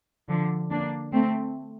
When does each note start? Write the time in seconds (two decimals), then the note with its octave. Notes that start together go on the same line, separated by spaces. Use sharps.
0.29 D3 F3
0.70 A#3 D4
1.13 A3 C4